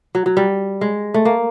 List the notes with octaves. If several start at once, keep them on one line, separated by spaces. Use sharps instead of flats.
F#3
F#3
G3
G#3
A3
A#3